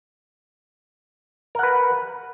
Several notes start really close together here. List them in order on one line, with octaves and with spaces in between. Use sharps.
A#4 F#5 B4